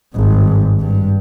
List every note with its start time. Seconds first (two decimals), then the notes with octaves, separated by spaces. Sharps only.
0.14 G#1 G2
0.80 G2